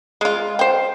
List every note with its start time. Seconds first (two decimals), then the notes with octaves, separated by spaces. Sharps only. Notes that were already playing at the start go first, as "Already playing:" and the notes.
0.21 G#3 F4
0.59 C5 G5